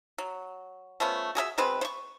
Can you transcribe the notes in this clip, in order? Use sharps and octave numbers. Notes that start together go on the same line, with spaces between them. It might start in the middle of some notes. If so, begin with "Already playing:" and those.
F#3
F3 A3 B3 C#4
F#4 G#4 A4 E5
B2 G#3 C4 B4
C5 C#6